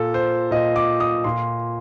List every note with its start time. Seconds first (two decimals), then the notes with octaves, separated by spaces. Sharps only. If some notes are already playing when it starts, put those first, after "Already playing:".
Already playing: A#2 A4
0.14 C5
0.51 A#2 D#5
0.76 D6
1.00 D#6
1.24 A#2 C6